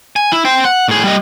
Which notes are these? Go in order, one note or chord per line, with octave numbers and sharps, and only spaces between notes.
G#5
E4
C5 G5
F#5
A2 G#4
G3 D#5